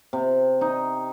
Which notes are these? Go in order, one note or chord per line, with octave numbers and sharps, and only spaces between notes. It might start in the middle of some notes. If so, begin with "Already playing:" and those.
C3
D#4